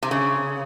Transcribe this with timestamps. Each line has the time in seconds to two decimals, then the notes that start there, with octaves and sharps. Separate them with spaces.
0.03 C3
0.11 C#3